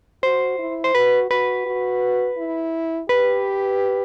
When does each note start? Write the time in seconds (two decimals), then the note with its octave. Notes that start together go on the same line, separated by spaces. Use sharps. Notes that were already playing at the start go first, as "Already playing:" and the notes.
0.23 F#4 C5
0.58 E4
0.84 C5
0.95 F#4 B4
1.31 F#4 B4
1.66 F#4
2.38 E4
3.09 G4 B4